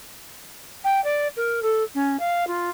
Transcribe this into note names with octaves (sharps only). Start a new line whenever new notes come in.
G5
D5
A#4
A4
C#4
F5
F4